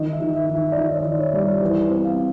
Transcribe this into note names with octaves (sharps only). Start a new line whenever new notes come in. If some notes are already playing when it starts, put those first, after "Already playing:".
Already playing: D#3 D#5
E5
D#3
E5
D#3
E5
D5
D#3 D#5
C#5
D5
D#3
C#5
G3 D5
C#5
E3 C5
C5
C4
F5